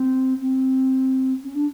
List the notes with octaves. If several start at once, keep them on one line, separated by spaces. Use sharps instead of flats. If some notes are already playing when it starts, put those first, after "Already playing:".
Already playing: C4
C4
C#4
D4